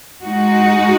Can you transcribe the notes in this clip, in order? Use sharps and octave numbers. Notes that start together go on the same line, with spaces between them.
G#3 D#4 F#4